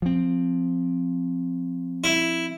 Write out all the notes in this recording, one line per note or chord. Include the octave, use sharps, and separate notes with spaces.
F3 C4
E4